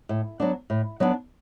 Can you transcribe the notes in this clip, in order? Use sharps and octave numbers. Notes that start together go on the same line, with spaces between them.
A2
F#3 B3 D4
A2
F#3 B3 D4